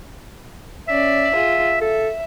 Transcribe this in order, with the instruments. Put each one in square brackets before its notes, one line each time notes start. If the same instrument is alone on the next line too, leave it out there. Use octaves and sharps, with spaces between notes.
[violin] C#4 D5 [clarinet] E5
[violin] F4 G#4
[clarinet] A4 [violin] E5